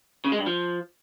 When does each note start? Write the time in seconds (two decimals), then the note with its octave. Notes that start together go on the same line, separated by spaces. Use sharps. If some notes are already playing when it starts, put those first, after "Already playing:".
0.24 C#3
0.32 G#3
0.39 G2
0.46 F3